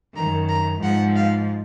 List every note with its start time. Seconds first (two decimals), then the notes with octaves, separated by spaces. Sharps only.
0.15 F#2 D#3 A#5
0.49 A#5
0.82 G#2 F3 F#5
1.15 F5